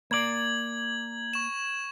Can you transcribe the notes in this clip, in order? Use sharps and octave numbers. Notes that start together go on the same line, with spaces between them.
A#3 D5 G#6 F#7
C#6 E7